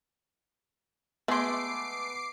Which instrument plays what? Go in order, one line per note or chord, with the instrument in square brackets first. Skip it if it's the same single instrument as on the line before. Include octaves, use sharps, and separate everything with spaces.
[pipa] G#3 C6 [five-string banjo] A3 G#4 [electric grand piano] B3 [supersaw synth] D6 C7 D7